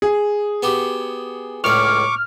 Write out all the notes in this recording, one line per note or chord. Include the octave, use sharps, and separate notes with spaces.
G#4
B3 F#4 G4
C#2 A2 D5 C#6 D6 F6